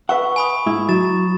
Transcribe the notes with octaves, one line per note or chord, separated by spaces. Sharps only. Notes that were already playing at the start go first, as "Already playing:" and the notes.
B4 E5 F#5 C#6
G#5 B5 D#6
G#2 E4
F#3 A6 E7